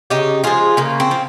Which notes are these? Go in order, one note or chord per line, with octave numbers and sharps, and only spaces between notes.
C#3 D#4 G4
F3 G#3 F4 G#4
C#3 A#3
C4
F3